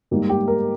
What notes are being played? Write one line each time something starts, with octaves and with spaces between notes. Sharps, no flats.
G#2 G3 A#3
G4
A#4